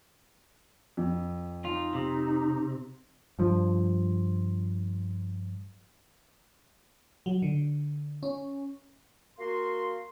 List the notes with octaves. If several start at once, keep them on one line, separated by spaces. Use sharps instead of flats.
F2
D#4 F4
C3
G2 F3
F#3
D3
C#4
A#3 F#4 C6